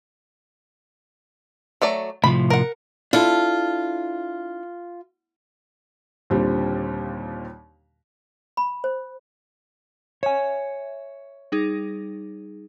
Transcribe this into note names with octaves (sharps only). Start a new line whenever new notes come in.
F#3 A3 D5
A2 C3 F3 B5
A#4 F#5
D4 E4 F4 A4
D#2 A#2 D3 G3 C4
B5
C5
C#5 E5 G#5
G3 D#4 G#4